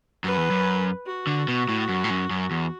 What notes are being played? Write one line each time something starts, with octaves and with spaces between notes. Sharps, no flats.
F#2 B4
E2
F#2
F#4
D3
B2
A2
F#2
A2
F#2
F#2
E2